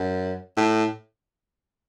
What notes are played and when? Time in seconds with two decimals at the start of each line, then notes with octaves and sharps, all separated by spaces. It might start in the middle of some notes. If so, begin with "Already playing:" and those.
Already playing: F#2
0.57 A2